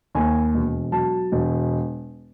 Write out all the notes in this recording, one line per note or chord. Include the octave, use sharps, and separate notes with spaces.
D#2 G#5
E1
F#3 A5
E1